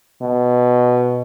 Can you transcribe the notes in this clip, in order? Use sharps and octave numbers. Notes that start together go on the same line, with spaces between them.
B2